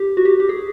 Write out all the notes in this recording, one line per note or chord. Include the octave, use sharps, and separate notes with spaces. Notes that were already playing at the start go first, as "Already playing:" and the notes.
Already playing: G4
F#4
G4
G4
G#4